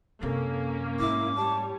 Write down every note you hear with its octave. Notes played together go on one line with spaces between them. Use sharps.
F#2 C3 A#3 C#4 A4
G#2 A3 E4 D6
G3 C#5 A5